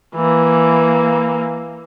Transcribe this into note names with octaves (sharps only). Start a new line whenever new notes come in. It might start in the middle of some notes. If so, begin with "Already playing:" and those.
E3 A#3